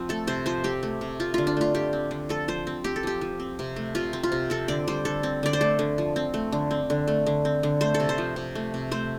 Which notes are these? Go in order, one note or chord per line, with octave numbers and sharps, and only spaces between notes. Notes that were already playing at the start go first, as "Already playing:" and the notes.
Already playing: F3 C4
A3 A4
C3 C5
F3 C5
C4 G4
A3
C3
C4 F4
D3 F4
D4
A3 F4
D3 G4
C4
D3
F3 A4
F3 C5
C4
C4 G4
A4
F3 G4
F3
C4
C3
A3
C3 F4
C4
F4
C3
C4 A4
D3 D5
G3 C5
D3 A4
C4
D3 D5
C5
A3 A4
D3
F3
C4
A3
D3
C4
D3
A3
D3
C4
D3
A3 C5
A4
C3
C5
F3
C3
A3
C3
A3 C5